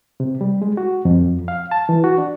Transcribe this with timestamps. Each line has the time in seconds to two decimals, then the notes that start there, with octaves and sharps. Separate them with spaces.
0.20 C3
0.41 G3
0.62 G#3
0.77 F#4
1.05 F2
1.48 F5
1.71 A5
1.89 E3
2.04 F#4
2.18 D4